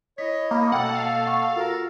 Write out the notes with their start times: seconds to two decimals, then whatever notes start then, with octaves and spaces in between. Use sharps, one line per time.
0.18 E4 C#5 D#5 B6
0.51 A#3 B5
0.72 B2 A#3 A4 F#5 G5
0.95 F5
1.26 F#5 C#6
1.56 F4 F#4 A4 A#4